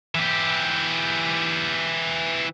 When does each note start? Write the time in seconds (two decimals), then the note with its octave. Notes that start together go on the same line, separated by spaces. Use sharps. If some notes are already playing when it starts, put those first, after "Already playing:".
0.15 E3 G4